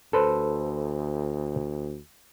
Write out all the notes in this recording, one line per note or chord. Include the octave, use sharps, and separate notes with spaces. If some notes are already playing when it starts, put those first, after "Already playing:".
D2 A4 B4 C5